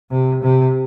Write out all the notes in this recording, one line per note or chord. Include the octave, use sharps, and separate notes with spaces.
C3
C3